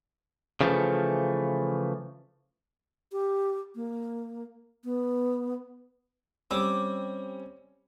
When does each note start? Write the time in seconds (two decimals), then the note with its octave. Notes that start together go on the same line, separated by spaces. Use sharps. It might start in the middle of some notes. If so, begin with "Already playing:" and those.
0.61 C#3 E3 F3 A3
3.12 G4
3.75 A#3
4.84 B3
6.51 G3 C4 C#4 D6 E6